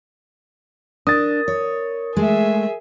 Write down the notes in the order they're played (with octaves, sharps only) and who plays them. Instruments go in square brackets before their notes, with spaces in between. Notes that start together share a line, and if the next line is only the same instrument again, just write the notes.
[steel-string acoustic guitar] D4 [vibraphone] A#4 [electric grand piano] D#6 A6
[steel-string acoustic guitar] C#5
[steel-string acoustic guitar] G#3 A3 [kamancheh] G#4 E5